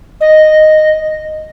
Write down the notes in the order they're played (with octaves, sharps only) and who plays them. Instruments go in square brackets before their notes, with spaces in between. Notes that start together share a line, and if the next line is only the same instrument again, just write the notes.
[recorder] D#5